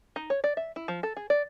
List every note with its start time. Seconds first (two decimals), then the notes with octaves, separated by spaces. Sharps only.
0.16 D#4
0.30 C#5
0.44 D5
0.57 E5
0.76 E4
0.88 F3
1.03 A4
1.17 G#4
1.30 D5